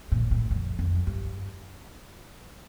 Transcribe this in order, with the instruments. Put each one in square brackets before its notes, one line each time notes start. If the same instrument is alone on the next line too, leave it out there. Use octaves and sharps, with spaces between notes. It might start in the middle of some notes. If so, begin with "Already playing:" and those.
[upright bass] A#2
A2
F2
F2
G2